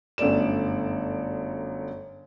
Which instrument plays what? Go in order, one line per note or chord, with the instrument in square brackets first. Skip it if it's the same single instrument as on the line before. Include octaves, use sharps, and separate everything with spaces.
[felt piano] G1 F#2 A3 D5 E7